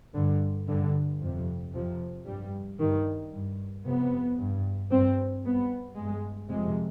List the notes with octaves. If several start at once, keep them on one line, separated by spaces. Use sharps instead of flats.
G2 D3
G2 D3
F2 C3
F2 C3 F3
G2 G3
G2 D#3
G2
F2 C3 B3
G2
G2 C4
G2 B3
G2 G#3
F2 C3 G#3